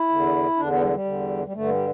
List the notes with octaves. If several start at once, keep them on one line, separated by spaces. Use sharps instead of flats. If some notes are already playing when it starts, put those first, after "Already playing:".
Already playing: E4
E2 D3
E2 D3 D4
B3
G3
G3
E2 D3
G3
G2 D3 A3
G3